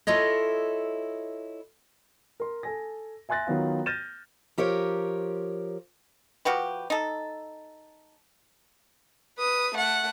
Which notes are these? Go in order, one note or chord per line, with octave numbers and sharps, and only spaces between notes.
E4 F4 A4 C#5 D#5
A#4 C6
A4 G#5 A#6
E5 G#5 C6 F#6 A6 A#6
D#3 F#3 B3 F4
F6 G6 A6 A#6 D#7 E7
F3 G4 A#4 C#5
F3 F#4 G4 B4
D#4 A4
B4 D#6
A3 F#5